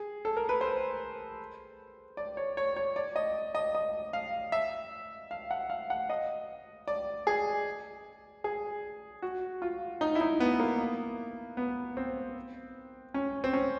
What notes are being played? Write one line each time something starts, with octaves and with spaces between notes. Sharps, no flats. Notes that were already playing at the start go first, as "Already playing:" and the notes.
Already playing: G#4
A4
A#4
B4
C5
D5
C#5
C#5
C#5
D5
D#5
D#5
D#5
F5
E5
F5
F#5
F5
F#5
D#5
D5
G#4
G#4
F#4
F4
D#4
E4
D#4
B3
A#3
B3
C4
C#4
C4
C#4